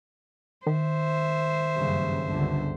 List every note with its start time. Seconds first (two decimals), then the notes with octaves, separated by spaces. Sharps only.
0.67 D#3 C5 E5
1.76 F#1 G2 C#3
2.25 G1 C#2 D3